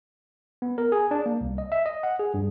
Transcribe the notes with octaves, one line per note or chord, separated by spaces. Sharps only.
B3
A#4
G#4
D4
A#3
C2
D#5
E5
D#5
F#5
G#4
G2